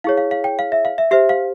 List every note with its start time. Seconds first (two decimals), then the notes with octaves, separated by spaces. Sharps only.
0.04 E4 G#4 C#5 F5
0.17 F5
0.31 F5
0.44 G5
0.59 F5
0.72 E5
0.85 F5
0.98 E5
1.11 G4 C5 E5
1.29 F5